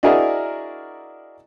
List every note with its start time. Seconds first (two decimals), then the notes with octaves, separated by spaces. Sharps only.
0.03 D4 E4 F#4 G#4 A#4 D#5